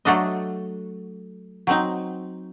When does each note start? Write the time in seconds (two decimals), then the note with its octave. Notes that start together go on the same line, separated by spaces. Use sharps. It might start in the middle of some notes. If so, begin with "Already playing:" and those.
0.05 F#3 A3 D4 A4 D#5
1.67 F#3 C4 D#4